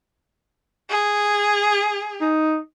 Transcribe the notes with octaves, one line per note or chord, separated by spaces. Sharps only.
G#4
D#4